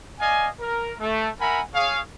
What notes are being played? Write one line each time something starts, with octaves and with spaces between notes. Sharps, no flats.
D5 D#5 F5 G#5
A#4
A3
A#4 E5 F#5 G#5 A#5 B5
G#4 C#5 F5